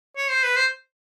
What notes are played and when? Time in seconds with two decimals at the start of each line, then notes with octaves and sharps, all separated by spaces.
0.17 C#5
0.30 C5
0.43 B4
0.56 C5